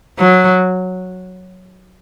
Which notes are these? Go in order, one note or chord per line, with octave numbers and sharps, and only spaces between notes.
F#3